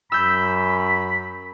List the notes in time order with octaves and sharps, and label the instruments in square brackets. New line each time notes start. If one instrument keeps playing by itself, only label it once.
[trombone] F#2 [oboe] B5 [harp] E6 G6